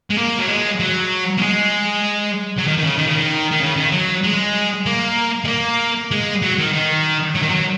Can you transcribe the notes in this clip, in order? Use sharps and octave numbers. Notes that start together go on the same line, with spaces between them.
G#3
A#3
F#3
G#3
F#3
A#3
G#3
F#3
D#3
D#3
C#3
D#3
C#3
D#3
D#3
C#3
D#3
F#3
G#3
A#3
G#3
A#3
G#3
F#3
D#3
D#3
F#3
D#3
F#3